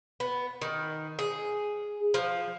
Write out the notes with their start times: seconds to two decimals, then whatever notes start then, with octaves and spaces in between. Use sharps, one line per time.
0.20 B3
0.61 D#3
1.19 G#4
2.14 F3